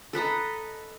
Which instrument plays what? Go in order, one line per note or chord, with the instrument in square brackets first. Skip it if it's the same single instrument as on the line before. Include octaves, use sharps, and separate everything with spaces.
[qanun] A4 B4 D#5 A#5